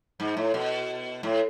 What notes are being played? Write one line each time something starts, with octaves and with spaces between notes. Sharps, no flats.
G#2
A2
B2
A2